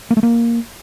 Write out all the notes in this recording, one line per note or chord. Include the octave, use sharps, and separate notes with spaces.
A#3
A3
A#3